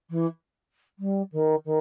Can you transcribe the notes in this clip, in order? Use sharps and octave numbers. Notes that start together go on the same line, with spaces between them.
E3
G3
D#3
D#3